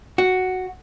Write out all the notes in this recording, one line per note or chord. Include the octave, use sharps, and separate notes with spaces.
F#4